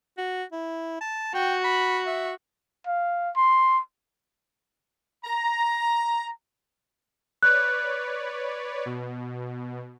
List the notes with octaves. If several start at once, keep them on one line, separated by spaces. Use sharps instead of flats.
F#4
E4
A5
F#4 G5
B5
E5
F5
C6
A#5
B4 C#5 D5 F#6
B2